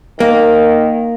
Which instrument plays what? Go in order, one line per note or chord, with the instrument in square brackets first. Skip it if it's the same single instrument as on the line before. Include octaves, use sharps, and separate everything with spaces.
[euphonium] D#3 [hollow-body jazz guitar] A#3